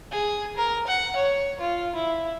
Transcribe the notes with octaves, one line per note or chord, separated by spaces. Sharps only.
G#4
A#4
F#5
C#5
F4
E4